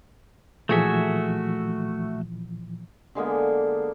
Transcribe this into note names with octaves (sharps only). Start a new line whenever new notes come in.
A#2 E3 F3 A3 F#4 G#4 A4 E5
D3 G#3 A#3 B3